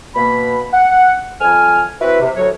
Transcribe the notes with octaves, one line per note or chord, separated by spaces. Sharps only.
B2 A#3 B5
F#5
F2 G#5 F6
C4 E4 F#4 B4
C3
D2 A2 F#3 F#4 C#5